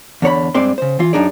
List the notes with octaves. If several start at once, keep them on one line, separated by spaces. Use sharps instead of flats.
E2 D3 C#5 B5
G2 G#3 C4 D5 C6
C#3 C5
E3 F4
F#2 C#3 D4 D#4 G#4 D5